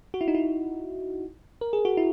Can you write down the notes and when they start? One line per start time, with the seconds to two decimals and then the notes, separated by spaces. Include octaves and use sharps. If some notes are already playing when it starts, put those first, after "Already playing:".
0.14 F#4
0.21 E4
0.28 D#4
0.35 E4
1.61 A#4
1.73 G#4
1.85 F#4
1.97 E4